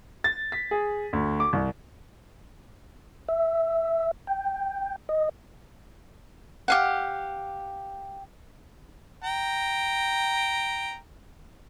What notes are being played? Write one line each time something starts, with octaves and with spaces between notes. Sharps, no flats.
A6
B6
G#4
D2
D6
C2
E5
G5
D#5
G4 F5 F#5
G5 A#5